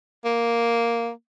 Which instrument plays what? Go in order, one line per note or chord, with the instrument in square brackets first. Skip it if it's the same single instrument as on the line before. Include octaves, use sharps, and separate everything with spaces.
[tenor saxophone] A#3